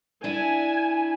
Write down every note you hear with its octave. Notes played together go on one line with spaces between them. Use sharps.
D4 E4 G#5